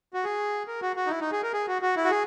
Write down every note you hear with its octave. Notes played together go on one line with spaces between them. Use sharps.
F#4
G#4
A#4
F#4
F#4
D#4
E4
D#4
G#4
A#4
G#4
F#4
F#4
E4
F#4
G#4